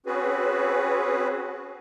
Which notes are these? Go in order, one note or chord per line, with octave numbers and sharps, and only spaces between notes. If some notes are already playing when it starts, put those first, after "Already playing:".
C4 C#4 F#4 G#4 B4